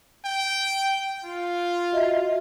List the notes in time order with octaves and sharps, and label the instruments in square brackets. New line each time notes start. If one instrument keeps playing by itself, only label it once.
[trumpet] G5
F4
[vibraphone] F#4 D#5 E5